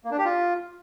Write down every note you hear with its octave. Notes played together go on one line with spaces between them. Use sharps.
A#3
D4
G4
F4